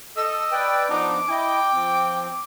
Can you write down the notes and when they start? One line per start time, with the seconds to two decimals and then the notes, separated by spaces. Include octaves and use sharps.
0.17 A4 D#5 E6
0.52 B4 D5 G5
0.89 F3 B3 D4 D#4 D6
1.29 E4 D#5 G5
1.72 F3 C4